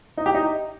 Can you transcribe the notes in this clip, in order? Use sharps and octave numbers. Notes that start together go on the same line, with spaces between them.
D#4
G4
D#4